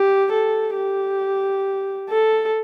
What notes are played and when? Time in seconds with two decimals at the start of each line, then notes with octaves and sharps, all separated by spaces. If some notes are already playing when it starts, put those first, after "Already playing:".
Already playing: G4
0.32 A4
0.76 G4
2.10 A4